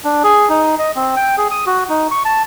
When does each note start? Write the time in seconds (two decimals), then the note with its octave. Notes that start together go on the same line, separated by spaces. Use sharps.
0.04 D4
0.24 G#4
0.49 D#4
0.79 D#5
0.96 C4
1.16 G5
1.38 G#4
1.51 D#6
1.67 F#4
1.89 D#4
2.11 C#6
2.25 A5